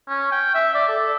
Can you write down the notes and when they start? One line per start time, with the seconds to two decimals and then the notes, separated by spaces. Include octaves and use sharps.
0.09 C#4
0.32 G5
0.54 E5
0.74 D5
0.88 A4